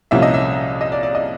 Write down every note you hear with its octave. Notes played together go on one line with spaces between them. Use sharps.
C2 A#2 F3 A#3 C#4 E5
D#5
E5
D#5
D5
D5
D#5